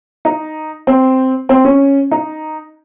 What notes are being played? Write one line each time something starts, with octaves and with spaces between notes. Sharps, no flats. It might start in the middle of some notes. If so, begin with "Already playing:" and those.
D#4
C4
C4
C#4
D#4